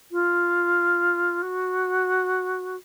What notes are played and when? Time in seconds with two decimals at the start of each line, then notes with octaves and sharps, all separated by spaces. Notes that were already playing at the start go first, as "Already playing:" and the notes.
0.11 F4
1.42 F#4